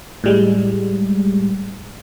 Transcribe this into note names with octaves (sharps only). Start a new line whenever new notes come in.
A2 G3 G#3